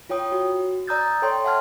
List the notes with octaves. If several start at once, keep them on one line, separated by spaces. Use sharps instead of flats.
F4 C#5 G5 D#6
F#4
D5 A#5 D#6 E6 G6 A6
A4 C#5 G5 C6
E5 F#5 A5 C6 F6 G#6